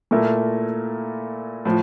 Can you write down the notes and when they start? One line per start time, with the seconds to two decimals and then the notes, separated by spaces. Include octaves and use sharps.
0.11 A#2 A3 E4 A#4
1.65 A2 F3